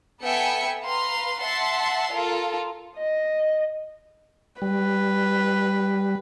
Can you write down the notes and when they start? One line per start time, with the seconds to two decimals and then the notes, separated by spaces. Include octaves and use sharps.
0.22 B3 A4 E5 G5 G#5 C#7
0.83 B4 F5 A#5 C6
1.41 E5 F#5 A5 C6
2.13 F4 A4 A#4
2.97 D#5
4.62 G3 B4